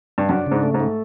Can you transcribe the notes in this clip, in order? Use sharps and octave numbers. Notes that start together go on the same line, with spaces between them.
G2
F#2 D4
G#2 C#3
A3
G#2
A3